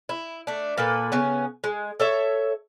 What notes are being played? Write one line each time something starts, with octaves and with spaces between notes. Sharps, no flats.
E4
A3 D4
A#2 A#3 A4 B4
C#3 B3 C#4
G#3
A4 C#5 E5